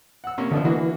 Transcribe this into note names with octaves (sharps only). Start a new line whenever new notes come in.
F#5 E6
C3 A#3 C#4
C2 B2 D3 F3
E3 A#3 D4 F#4
E3